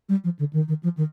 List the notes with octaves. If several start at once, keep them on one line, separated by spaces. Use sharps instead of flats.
G3
F3
D3
D#3
D#3
F3
D#3